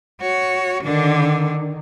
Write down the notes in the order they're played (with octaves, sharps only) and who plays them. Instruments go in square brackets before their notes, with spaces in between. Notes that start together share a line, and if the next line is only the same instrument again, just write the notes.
[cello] F#4 C#5
[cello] D3 D4 [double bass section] D#3